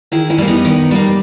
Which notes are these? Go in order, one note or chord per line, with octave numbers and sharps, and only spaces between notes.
D#3 E4 G#4
C#4 E4
G3 A#3
B3 D#4
D#3
G3 A#3